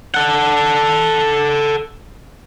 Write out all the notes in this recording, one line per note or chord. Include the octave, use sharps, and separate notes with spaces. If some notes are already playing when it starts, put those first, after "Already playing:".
A4 F#5